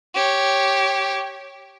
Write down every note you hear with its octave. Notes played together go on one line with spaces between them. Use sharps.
G4 C#5